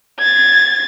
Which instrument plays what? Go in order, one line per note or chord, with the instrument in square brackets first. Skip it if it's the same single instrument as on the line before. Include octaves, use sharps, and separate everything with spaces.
[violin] G#6 A6